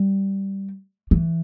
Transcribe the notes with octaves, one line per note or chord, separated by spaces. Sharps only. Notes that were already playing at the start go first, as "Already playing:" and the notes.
Already playing: G3
E3